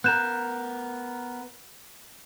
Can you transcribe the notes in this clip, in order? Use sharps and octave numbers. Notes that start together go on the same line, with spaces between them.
B3 A#4 F#6 G6 E7